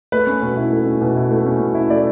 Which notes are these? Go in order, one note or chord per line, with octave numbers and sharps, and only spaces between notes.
A3 B4
C#4
B2
E4
A3
C#4
B2
E4
A3
C#4
B2
E4
A3 D5